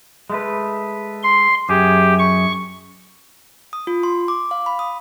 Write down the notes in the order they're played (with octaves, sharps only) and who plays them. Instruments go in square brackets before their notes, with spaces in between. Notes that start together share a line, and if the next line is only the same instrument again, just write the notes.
[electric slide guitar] G#3 A3 B4
[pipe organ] C6
[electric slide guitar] F#2 G#4 [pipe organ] G4
[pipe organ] C#6
[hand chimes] D#6
F4
C6
D6
F5
B5
D#6